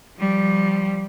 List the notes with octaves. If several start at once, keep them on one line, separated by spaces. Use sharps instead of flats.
F3 G3